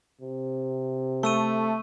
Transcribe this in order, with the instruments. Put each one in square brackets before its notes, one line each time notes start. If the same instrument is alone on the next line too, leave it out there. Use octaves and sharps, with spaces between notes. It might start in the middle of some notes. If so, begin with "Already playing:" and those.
[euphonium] C3
[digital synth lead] A3 [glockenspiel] C#6 E6 D#7